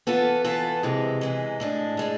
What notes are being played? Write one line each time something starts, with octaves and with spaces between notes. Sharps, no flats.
E3 B3 F4 A4
E3 B3 F4 A4
C3 E3 G#3
C3 E3 G#3
A2 G#3 D4
A2 G#3 D4